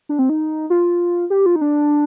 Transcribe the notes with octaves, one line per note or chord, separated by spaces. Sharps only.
D4
C4
D#4
F4
G4
F4
D#4
D4